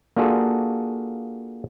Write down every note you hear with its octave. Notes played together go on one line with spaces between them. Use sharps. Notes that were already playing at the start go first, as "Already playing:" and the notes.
A#3 D4 F4 F#4 G#4 A4